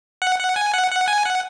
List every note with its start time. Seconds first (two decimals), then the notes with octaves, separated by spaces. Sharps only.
0.22 F#5
0.39 F#5
0.56 G#5
0.73 F#5
0.91 F#5
1.08 G#5
1.25 F#5